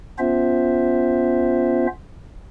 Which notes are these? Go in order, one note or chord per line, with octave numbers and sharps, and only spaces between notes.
B3 C#4 F4 C5 E5